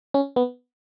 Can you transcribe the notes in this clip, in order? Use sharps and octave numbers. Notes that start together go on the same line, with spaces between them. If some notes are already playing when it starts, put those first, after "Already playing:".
C#4
B3